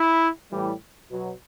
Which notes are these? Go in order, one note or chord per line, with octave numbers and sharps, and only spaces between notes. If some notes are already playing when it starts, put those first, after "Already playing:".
Already playing: E4
A2 E3 G3
B2 F#3